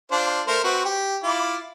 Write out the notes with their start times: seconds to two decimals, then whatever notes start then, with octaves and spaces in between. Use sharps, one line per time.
0.12 D4 F4 C5
0.47 A3 A#4 C5
0.64 C4 F#4 B4
0.85 G4
1.24 E4 F4 D6